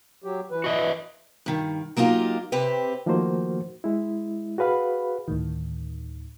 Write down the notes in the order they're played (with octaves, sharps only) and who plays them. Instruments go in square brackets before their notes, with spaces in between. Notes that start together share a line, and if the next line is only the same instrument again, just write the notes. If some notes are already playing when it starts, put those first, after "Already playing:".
[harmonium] F#3 G4
E3 B4
[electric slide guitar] F#4 D#5 E5
[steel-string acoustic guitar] G2 D#3
F#3 A#3 D#4 F4 G4
C3 C4 G4 B4
[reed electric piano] D#3 F3 A3 A#3 F#4 C5
G#3 E4
F#4 G#4 B4 F5 B5
[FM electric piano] D2 A2 D#3